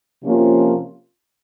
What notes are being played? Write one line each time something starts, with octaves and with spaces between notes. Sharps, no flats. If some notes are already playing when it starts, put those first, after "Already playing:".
C3 F3 A#3 C#4 F4